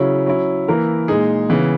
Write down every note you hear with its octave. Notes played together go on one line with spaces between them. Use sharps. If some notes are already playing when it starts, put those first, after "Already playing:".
Already playing: C#3 F#3 C#4 E4
F#3 C#4 E4
E3 A#3 E4 A#4
A#2 G#3 D#4 G#4
C#3 E3 B3